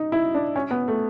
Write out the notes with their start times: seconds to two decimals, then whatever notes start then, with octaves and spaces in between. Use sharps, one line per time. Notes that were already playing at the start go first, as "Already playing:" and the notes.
Already playing: D#4
0.12 E4
0.35 D4
0.56 C#4
0.71 B3
0.88 A3